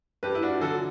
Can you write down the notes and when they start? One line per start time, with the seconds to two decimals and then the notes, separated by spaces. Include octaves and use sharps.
0.23 G2 G4 B4
0.35 E4
0.42 D4 F#4
0.61 D3 F#3 F#4 A4